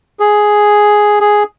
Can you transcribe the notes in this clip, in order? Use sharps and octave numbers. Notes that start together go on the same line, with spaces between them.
G#4
G#4